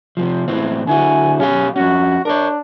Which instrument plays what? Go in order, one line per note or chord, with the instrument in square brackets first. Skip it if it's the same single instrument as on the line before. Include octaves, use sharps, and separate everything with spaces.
[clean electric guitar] C3 D#3 F3
A2 E3 C4
[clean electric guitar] D3 E4 F#4 [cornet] G#5
[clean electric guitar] B1 G4 F5 [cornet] C#4
[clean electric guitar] F2 C#4 [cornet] F#4
[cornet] D4 [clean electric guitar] A#4 C#5